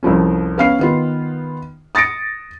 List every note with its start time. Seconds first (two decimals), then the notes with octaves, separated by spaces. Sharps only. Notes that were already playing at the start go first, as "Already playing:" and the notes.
0.03 C2 F2 F3 C#4
0.58 B3 C#4 F5 F6 C7
0.79 D#3 B3 F4
1.95 D#6 A6 A#6 C#7 D7